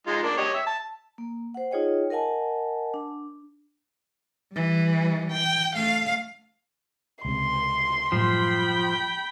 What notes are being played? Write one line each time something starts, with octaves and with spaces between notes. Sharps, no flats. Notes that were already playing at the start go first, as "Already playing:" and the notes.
G#3 D#4 F4
A#3 D4
G4 C#5 D#5
E5
A5
A#3
C5 F#5
D#4 F4 G#4 C#5 D#5 G5
A#4 D#5 F#5 G#5 A5
D4
E3 G3
G5
A3 F5
C#2 C3 C6
F#2 A2 F3 G3 G5 B5